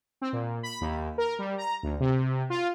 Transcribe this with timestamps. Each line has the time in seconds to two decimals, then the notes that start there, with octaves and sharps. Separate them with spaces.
0.21 C4
0.33 A#2
0.63 B5
0.81 D#2
1.18 A#4
1.39 G3
1.58 A#5
1.83 D2
2.00 C3
2.50 F4